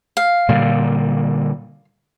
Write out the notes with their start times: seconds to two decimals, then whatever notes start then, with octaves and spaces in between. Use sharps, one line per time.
0.17 F5
0.49 A#2 D3 G3